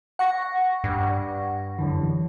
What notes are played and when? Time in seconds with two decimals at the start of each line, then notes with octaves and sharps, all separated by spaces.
0.19 F#5 C#6 A#6
0.84 G2
1.78 F#2 D3 E3